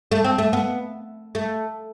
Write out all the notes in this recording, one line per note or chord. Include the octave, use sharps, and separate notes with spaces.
A3
C4
A3
B3
A3